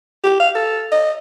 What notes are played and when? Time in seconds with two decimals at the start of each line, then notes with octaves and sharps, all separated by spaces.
0.24 G4
0.40 F5
0.55 A4
0.92 D#5